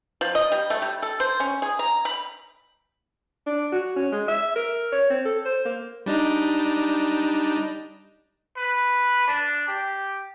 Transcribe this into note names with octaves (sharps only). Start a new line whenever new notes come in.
F3
D#5
G3
A3
G3
A4
C5
C#4
G#4
A#5
B5
D4
F#4
C#4
G#3
E5
A#4
C#5
C4
A4
C5
A#3
G3 D4 D#4
B4
D4
G4